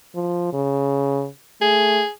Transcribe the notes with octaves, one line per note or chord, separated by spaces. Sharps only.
F3
C#3
A3 G#4